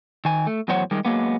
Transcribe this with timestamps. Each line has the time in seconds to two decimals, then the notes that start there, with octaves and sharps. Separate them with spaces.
0.25 D#3 G#5
0.47 A3
0.68 E2 A2 F#3 C5 C#5 F#5
0.91 D#3 G3 G#3
1.05 F#3 G#3 A#3 B3